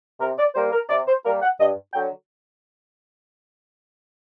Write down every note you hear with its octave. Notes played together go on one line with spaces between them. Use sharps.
C3 A#4
D5
G3 A#3 C5
A#4
C3 D5
C5
G3 A#3 A#4
F#5
G2 D#5
D3 F#3 G5